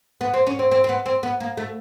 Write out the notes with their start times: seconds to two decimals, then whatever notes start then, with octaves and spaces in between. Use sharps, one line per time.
0.21 B3
0.34 C4
0.47 C#4
0.59 C4
0.71 C4
0.84 C4
0.89 B3
1.06 C4
1.23 B3
1.40 A#3
1.57 A3